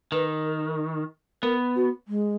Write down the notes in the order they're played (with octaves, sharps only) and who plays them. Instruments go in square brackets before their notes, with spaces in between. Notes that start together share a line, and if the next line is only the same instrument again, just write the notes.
[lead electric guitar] D#3 [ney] B4
[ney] A#4
[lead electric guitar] B3 [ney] A#4
[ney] F#4
G#3